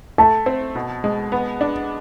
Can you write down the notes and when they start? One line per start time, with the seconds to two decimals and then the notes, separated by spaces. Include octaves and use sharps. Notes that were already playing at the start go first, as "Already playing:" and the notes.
0.18 A3 A5
0.46 C4
0.75 B2
1.04 G#3
1.32 B3
1.61 D4